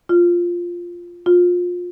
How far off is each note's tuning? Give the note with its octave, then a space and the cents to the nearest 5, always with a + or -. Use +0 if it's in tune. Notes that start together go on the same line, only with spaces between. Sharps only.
F4 +0
F4 +25